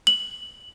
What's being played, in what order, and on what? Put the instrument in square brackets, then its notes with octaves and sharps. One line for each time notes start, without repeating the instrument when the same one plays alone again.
[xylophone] F#7